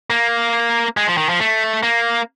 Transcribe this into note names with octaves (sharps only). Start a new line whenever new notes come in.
A#3
G#3
F3
D#3
F3
A3
A#3